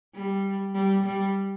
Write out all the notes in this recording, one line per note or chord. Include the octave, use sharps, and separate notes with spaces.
G3
G3
G3